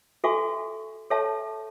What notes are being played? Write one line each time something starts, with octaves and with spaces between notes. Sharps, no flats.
F#4 A4 E5 G#5 C#6
A4 C#5 E5 A5 C#6